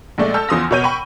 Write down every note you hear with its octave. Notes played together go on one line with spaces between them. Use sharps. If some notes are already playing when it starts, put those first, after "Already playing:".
A#1 G#3 A3 D5
A4 A5 E6 F6 G6
E2 F3 C6 D#6 F6 A#6
B2 A#4 C#5 G6 D#7
G5 B5 C#6